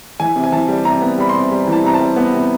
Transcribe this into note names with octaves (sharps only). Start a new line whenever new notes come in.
E3 G#5
C3
G#5
E3 A5
G3
C3 A#5
B3
G3 B5
C6
C3
G3
E3 A5
C3 A#5
A5
G3
B3
C3